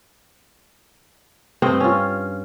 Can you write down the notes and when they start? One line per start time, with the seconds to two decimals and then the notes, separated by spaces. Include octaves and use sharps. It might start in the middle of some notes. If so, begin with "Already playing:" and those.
1.62 G2 C4 D#5
1.80 C#4 F4